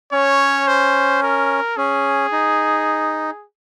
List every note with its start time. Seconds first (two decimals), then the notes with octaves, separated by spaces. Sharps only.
0.12 C#4 C#5
0.67 C5
1.23 A#4
1.77 C#4 G#4
2.32 D#4